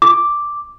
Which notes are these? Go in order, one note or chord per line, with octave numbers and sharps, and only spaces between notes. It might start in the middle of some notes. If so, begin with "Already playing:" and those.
D6